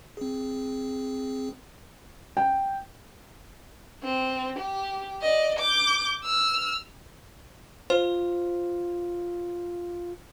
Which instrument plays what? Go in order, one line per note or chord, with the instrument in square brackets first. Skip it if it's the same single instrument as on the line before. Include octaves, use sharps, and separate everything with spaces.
[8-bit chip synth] C4 G#4
[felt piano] G5
[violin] C4
G4
D5 D#5
D6 G6
E6 F6
[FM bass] F4 [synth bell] C5